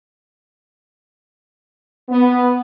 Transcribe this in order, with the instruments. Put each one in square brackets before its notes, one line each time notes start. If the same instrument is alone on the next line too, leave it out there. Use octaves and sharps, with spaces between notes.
[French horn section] B3